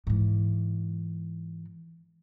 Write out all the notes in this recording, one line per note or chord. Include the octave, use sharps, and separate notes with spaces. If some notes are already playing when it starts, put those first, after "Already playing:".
G#2 E3